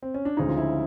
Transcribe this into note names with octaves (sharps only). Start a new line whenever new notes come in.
C4
C#4
D4
D2 C#3 F3 G#3 D#4
F4
E4